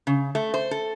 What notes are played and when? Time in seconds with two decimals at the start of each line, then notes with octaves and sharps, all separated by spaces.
0.07 C#3
0.35 A3
0.54 C5
0.71 A4